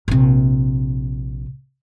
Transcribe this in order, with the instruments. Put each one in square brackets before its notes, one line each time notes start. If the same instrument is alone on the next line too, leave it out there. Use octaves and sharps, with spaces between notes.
[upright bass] A#1 C3